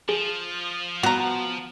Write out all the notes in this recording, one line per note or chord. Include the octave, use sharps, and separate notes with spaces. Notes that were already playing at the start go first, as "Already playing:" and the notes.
F3 G#4
B3 F#4 A#5